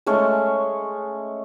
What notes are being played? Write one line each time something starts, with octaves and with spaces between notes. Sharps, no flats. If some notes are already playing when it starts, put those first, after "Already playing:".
G#3 A3 C#4 C#5